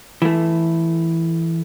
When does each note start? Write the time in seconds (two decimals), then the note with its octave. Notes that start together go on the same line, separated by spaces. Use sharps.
0.22 E3 A3